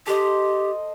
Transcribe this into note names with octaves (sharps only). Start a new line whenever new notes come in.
G4 A4 C5 D#5